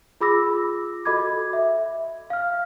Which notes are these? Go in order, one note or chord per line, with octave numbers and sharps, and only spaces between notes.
F4 G#4 B5 D6 E6 A#6
F#4 A4 D#5 B5 D6 G#6
E5
F5 F6